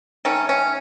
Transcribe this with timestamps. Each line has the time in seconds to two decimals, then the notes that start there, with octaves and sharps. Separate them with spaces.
0.25 D#3 A3 C#4
0.49 C#4